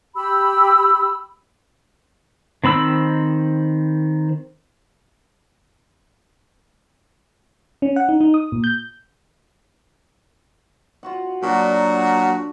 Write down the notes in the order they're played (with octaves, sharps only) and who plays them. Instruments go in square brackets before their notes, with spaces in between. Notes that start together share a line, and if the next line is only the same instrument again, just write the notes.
[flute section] G4 B5 E6
[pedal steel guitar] D#3 C4 B5 E6
[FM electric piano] C#4
F#5
D#4
D#4
D#6
A#2
G6
[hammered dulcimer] F4 F#4 F#5
[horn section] A#2 F#3 F#4 [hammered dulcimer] D4 A5